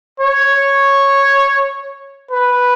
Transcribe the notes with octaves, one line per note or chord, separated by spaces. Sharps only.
C#5
B4